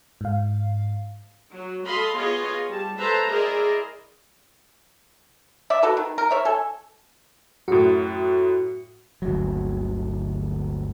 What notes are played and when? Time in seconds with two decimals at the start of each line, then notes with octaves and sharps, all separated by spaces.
0.21 G#2 F5
1.51 F#3
1.86 A4 D#5 F5 B5 C6
2.16 B3 F4 G#4 C#5 D#5
2.68 G3 A5
2.98 A4 B4 C5 E5 A5 A#5
3.27 E4 G#4 A#4 C5 D5 D#5
5.70 D5 E5
5.82 F#4 A4 B4
5.97 D#3
6.18 A#4
6.31 C#5 E5
6.45 A4 G#5
7.68 F#2 A2 F#4
9.22 G1 D2 F#3